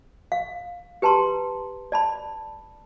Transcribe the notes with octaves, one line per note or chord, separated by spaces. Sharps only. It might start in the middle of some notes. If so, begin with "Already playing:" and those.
F5
G4 B4 A5 A#5 C6
D5 A5 B5